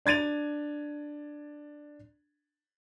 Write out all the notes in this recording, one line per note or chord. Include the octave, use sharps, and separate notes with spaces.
D4 G#6 A6 D#7 F7